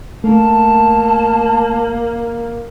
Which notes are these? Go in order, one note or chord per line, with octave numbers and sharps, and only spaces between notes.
A3 A#3 A5